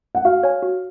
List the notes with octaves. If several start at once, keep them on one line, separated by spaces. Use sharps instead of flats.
F#5
F#4 F5
C#5 G#5
F#4